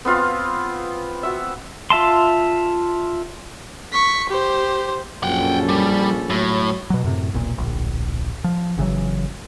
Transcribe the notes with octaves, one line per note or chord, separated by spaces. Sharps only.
B3 C4 F4 F5
F#4 E5
F4 E5 A5 C6
C#6 B6
G4 C5
A#1 F#2 C#4 A4 F#5 G5
G3
A2 F#3
B2 F#3
F#2 A2 C3
E1 B1 A#2
D1 A#1
F3
G1 C#3 E3 F#3